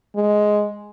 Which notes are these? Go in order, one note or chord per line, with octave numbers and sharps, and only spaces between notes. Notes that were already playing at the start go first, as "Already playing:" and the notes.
G#3